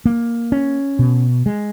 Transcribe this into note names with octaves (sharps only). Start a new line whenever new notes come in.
A#3
C#4
B2
G#3